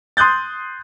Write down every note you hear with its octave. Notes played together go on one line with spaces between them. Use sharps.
C6 D#6 F#6 G6 A6